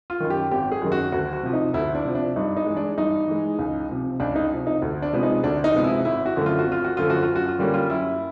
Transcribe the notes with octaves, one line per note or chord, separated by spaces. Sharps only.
F4
F#2 D#3
G4
G#1 G4
G#4
F#2 D#3
F#4
D2 F#4
F#4
C3 F3
D#4
D2 E4
D4
C3 F3
D4
G2 D#4
D#4
E3 G#3
D4
G2 D#4
E3 G#3
C#2
C3 F3
C#2 D4
D#4
C3 F3
D#4
D2
D4
C3 F3 G#3 B3
D#4
D2 D4
D#4
C3 F3 G#3 B3
E4
G#1 E4
F#4
F#2 D3 F3 A3
F4
F#4
G#1
F4
F#4
F#2 D3 F3 A3 F4
F#4
F4
F#2
F#4
F4
D3 G3 A#3 C#4 F#4
F4
F#2 E4